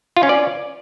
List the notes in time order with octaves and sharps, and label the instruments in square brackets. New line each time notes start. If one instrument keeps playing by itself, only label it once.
[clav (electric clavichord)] F4
C#4
D5